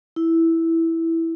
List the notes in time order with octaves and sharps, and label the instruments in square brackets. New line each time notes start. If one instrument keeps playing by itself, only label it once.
[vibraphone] E4